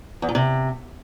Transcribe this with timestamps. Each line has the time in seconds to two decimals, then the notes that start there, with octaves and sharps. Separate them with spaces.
0.22 E2
0.29 A#2
0.35 C3